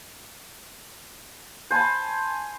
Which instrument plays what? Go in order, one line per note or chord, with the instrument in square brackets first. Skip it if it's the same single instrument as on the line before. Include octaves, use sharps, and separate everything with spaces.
[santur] C5 G#5 A5 B5